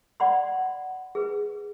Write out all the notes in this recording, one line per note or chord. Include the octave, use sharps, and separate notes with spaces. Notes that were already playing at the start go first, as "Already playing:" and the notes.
D5 F#5 B5 C6
G#4 B4